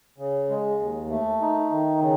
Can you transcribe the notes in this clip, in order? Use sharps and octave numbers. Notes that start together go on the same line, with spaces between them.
C#3
G#3
D#2
A3
D#4
D#3
C#3